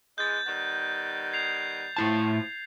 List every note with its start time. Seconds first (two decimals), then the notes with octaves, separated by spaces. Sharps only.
0.18 E3 G#3 G6 A6
0.46 D#3 G3 B3 A6
1.33 G#6 C7 F7
1.97 A2 F3 E4 A5